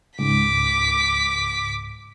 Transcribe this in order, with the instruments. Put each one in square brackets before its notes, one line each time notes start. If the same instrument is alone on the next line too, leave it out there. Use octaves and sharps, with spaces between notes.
[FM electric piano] C#2 G#2 [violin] D6 B6